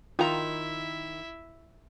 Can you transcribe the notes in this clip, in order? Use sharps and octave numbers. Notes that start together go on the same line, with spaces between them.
D#3 E4 F4 E5 A#5